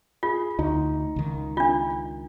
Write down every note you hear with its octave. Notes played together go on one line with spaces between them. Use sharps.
F4 G#4
D2 D#4
C#2 D#3
D4 F4